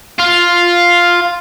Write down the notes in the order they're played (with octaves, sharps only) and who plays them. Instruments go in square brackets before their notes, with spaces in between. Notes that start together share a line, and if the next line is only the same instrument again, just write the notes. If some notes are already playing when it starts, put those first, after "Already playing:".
[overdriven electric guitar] F4